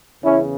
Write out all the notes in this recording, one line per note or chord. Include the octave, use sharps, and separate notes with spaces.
E2 C#3 E3 C#4 E4